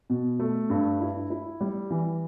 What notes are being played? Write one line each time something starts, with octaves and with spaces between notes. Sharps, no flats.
B2
A3
G2
E4
E4
G3
E3